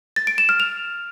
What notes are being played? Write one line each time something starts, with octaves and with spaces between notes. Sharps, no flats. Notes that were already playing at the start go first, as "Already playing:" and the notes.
A6
D7
E7
F6
F7